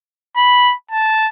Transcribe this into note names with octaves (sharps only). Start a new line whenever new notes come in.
B5
A5